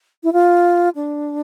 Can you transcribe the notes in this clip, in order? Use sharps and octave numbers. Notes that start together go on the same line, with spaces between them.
E4
F4
D4